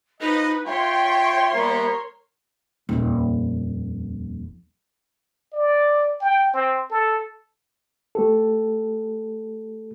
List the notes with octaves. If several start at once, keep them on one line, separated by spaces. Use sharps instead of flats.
F3 D#4 B4 D#5
F4 C#5 E5 G5 C6
G3 A#3 B3 A#4
D#1 F2
D5
G5
C4
A4
A3 G4 A4